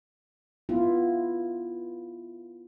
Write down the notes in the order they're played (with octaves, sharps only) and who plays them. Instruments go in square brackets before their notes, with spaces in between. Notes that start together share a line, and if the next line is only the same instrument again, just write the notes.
[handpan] B3 E4 F4